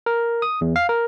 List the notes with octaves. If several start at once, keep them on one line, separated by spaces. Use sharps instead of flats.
A#4
D#6
E2
F5
A#4